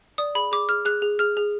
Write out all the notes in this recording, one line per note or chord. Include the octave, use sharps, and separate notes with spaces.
D5 D#6
G#4 B5
G#4 D6
G#4 F6
G#4 F#6
G#4
G#4 F6
G#4